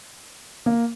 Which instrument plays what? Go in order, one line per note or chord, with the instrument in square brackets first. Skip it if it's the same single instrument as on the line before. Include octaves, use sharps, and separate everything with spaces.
[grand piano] A#3